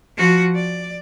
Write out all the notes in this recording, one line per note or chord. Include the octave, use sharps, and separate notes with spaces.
F3 F#4
D5